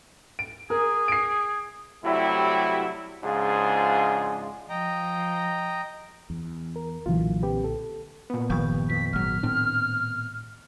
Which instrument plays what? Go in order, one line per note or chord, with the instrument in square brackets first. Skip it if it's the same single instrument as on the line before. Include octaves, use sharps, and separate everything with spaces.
[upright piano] D7
[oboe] G#4 [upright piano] A#4
[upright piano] C7 D7
[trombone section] C3 F#3 G3 A3 E4
G#2 C#3 F3 D4 F4 G#4
[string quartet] F3 [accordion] D#5 G5 A#5
[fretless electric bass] E2
[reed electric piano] A#4
[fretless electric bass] B1 A#2 D3 [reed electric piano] E3 F#3 F4
[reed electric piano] C4 G4 B4
A4
A#2 B3
[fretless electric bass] G1 F3 G3 [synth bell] D#3 C#6 G6
[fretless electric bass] F2 [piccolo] B6
[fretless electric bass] G#1 F#3 [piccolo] F6
[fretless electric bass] A2 C4 D4